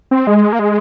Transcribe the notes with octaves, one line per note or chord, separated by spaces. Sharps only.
C4
G#3
A#3
G#3